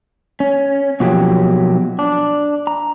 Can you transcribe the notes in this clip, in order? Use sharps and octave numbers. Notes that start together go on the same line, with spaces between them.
C#4
B2 F3 F#3 A#3 G4
D4
A#5